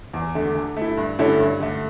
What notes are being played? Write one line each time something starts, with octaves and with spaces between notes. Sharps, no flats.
E2
D3 A3
D3
A3
E4
G2
D3 A3 C#4 E4
G2
D3 A3